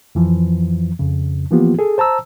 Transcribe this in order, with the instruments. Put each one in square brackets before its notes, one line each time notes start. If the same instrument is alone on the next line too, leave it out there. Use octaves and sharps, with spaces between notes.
[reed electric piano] F2 E3 F3
F2 C#3
E3 F3 A#3 B3 F4 G4
G#4 A4
C5 A5 A#5 E6